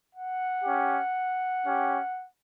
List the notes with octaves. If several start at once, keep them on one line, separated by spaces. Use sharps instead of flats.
F#5
C#4 G4
C#4 G4